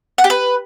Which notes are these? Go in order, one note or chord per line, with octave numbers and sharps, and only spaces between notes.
F#5
G4
B4